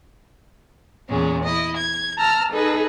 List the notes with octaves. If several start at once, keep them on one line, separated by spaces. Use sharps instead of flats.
E2 A#2 G#3 C#4
E4 D#5
G#6
A5 A#5 E6 F6
D#4 G#4 A4 B4